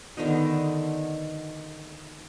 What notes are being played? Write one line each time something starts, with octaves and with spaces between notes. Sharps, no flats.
D3 D#3 B3 D#4